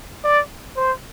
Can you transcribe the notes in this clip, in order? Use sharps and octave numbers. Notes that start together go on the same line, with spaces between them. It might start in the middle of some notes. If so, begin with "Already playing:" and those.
D5
C5